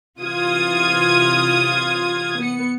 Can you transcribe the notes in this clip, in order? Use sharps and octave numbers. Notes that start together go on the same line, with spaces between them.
C3 E3 F4 D#6 G#6
B3 C#7